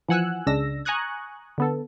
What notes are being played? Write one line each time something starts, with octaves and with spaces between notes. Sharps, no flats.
E3 F3 F#5 G#5 E6 F#6
C#2 C#3 G#3 D4 E6 A#6
G#5 A#5 C#6 D#6 F#6 G#6
D3 B3 A4